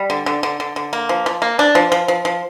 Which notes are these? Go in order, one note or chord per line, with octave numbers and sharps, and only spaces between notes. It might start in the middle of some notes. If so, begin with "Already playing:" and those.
Already playing: G3
D3
D3
D3
D3
D3
A#3
F3
F3
A#3
D4
F3
F3
F3
F3